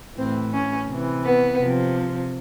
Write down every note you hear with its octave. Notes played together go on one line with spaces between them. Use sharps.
A2 E3 C4
C#4
C3
E3
B3
C3 F3